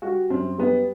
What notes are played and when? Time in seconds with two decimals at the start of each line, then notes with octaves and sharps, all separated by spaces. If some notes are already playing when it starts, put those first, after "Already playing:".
0.02 G3 F#4
0.30 F#2 C4
0.58 G3 B3